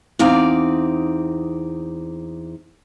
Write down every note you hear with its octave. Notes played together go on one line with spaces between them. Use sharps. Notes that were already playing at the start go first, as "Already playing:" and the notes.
E2 C4 D#4 D5 F5